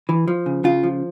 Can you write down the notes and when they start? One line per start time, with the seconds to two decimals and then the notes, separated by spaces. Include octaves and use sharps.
0.09 E3
0.28 F3
0.46 C#3
0.64 C#3 F4
0.83 F3